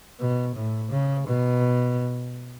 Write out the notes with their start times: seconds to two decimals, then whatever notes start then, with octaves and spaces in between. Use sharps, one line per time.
0.20 B2
0.55 A2
0.91 C#3
1.27 B2